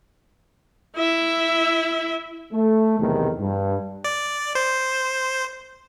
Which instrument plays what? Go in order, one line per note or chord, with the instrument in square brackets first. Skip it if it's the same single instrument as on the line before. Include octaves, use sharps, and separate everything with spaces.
[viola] E4 E5
[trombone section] A3
B1 E2 C3 D#3
G2
[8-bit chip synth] D5
C5